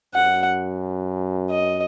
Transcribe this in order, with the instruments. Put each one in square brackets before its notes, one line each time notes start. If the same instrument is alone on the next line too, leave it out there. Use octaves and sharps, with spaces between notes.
[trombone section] F#2 [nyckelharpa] F#5
[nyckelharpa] D#5